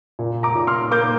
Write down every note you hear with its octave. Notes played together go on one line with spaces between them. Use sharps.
A#2
A#5 D6
A#2
C6 F6
A#3 D6 G6